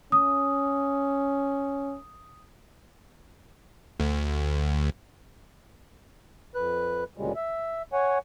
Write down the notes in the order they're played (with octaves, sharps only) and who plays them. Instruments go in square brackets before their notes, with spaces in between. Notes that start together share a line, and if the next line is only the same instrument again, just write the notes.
[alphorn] C#4 [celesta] D#6
[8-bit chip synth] D2
[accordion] F2 B4 F#6
D2 A#2 C#3 G3 G#3
E5
C#5 F#5 G#5